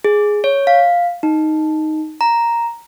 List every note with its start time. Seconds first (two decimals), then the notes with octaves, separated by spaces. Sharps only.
0.04 G#4
0.44 C#5
0.67 F5
1.23 D#4
2.21 A#5